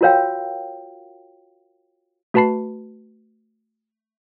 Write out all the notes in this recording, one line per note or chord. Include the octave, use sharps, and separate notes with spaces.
F4 F#4 A#4 C#5 F5 G5
A3 F#4 B4 A5 B5 C7